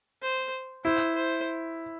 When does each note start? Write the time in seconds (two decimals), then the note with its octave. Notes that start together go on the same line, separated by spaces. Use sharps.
0.22 C5
0.84 E4 C5
1.15 C5